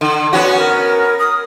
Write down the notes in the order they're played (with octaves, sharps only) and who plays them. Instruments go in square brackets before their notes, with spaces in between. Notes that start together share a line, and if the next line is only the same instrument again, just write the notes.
[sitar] D3
[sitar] B3 C#4 F#4 [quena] F#5
[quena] A#4
D#6